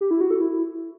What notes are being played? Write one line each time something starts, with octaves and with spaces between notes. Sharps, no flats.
G4
E4
F#4
A4
E4